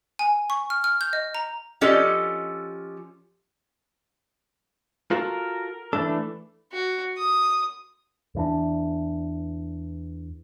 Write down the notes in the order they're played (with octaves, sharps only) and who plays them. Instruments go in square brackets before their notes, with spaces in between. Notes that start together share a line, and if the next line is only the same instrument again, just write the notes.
[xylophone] G#5
C#6
F6
F6
G6
D#5
A#5
[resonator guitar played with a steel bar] F3 C#4 G4 A4 D#5
[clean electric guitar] F4 F#4 A4 [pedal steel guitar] A#4
[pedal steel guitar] E3 A3 D4 [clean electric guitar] A4
[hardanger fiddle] F#4
D#6
[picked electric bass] E2 E3 D4